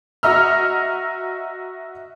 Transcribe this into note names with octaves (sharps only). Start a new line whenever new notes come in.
F#4 D#5 E5 A#5 E6 F6